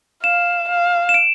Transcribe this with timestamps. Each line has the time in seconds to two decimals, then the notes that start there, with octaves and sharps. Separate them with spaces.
0.23 F5 E7
0.69 F5
1.09 E7
1.14 D7